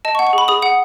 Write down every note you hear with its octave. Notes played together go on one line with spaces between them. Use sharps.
D#5 A5
C#6
F#5
C#6
G#4 B5
G#4 D#6
F#5 D#6